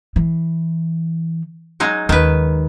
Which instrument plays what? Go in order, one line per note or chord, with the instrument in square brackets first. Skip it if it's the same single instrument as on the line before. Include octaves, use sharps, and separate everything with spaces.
[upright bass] E3
[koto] F#3 G#3 D#4
[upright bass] D#2 [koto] D#3 B4